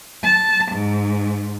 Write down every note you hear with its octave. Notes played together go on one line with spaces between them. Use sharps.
A5
G#2